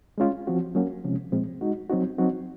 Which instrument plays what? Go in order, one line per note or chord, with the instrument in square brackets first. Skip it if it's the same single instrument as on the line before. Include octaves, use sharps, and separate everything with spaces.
[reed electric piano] G#3 C#4 F4
F3 C4 F#4
F#3 A#3 C#4 F#4
C3 F3 G#3 C#4
A#2 F3 G#3 C4
G#3 D#4 F#4
F#3 C4 D#4 F#4
F#3 C4 D#4 F#4